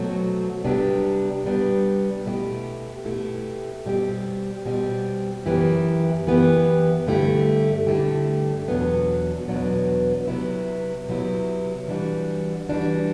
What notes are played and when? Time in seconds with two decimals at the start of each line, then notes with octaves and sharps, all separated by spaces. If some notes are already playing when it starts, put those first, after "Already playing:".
Already playing: B2 F#3 A3 C4 F#4
0.64 C3 G3 B3 D4 G4
1.45 C3 G3 B3 D4 G4
2.25 B2 A3 E4 G4
3.05 B2 A3 E4 G4
3.86 B2 G3 C4 G4
4.65 B2 G3 C4 G4
5.46 F#2 E3 B3 E4 G4
6.27 F#2 E3 B3 E4 G4
7.07 G2 D3 A3 E4 G4
7.87 G2 D3 A3 E4 G4
8.68 E2 B2 F#3 B3 D4
9.48 E2 B2 F#3 B3 D4
10.27 C3 F#3 B3 E4
11.09 C3 F#3 B3 E4
11.88 E3 G3 D4 F#4
12.69 E3 G3 D4 F#4